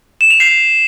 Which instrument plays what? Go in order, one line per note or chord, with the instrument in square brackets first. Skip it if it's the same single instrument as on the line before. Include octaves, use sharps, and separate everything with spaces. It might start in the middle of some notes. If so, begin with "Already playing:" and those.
[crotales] E7
F7
C7